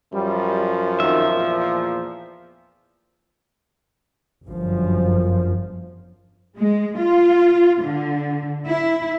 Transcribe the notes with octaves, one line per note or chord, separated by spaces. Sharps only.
F#2 F3 G3
F2 D#3 F#3 E5
E2 A#2 A#3
G1 F#2 F3
G#3
F4
D3
E4